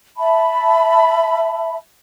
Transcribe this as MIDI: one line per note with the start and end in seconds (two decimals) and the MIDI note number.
0.18 1.77 76
0.18 1.77 81
0.18 1.77 83